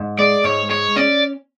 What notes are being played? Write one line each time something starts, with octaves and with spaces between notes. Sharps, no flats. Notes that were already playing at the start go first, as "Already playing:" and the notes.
Already playing: G#2
G#3 D5
G#2 C#5
G#3 C#5
C#4 D5